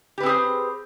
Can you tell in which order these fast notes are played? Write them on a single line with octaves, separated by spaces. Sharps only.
G4 B4 C4 G#4 C5